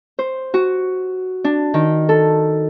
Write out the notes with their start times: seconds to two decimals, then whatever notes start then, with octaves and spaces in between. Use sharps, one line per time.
0.19 C5
0.54 F#4
1.44 D4
1.74 D#3
2.09 A4